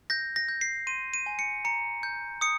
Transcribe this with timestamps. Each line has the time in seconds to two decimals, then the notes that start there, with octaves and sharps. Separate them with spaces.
0.10 G6 A#6
0.36 A#6
0.49 G6
0.61 C7
0.87 C6 D#7
1.14 D#7
1.26 G#5
1.39 C#7
1.65 A#5 C#7
2.03 G6
2.41 D#6 C#7